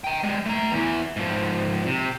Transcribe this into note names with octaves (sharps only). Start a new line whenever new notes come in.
G5 A#5
G3 G#3
A3 A#5
E2 E3
G#2 F3
C3